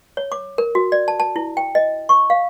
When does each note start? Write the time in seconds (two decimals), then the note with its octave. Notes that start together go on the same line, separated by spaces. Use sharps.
0.17 C#5
0.32 D6
0.58 A#4
0.75 F#4
0.92 D5
1.08 A5
1.20 A5
1.36 E4
1.57 G5
1.75 D#5
2.09 C#6
2.30 F5